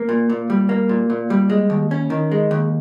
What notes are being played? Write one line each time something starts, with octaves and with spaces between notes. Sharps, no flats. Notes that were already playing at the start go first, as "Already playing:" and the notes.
Already playing: A#3
A#2
A#2
G3
A#3
A#2
A#2
G3
G#3
D#2
C#4
D#3
G#3
D#2